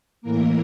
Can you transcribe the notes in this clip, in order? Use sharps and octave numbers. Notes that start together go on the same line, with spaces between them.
A2 E3 A#3 A#4